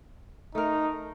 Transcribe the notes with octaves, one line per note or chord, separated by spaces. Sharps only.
A3 D#4 A#4